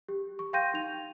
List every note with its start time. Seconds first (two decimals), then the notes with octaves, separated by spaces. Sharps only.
0.09 G4
0.39 C#6
0.53 F5 G5 C6 G6 A#6 D#7
0.74 D#4 F7